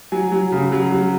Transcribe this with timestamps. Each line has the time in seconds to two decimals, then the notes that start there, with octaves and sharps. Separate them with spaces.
0.12 F#3 G#5
0.32 F#3
0.52 C#3
0.72 F#3
0.92 F#3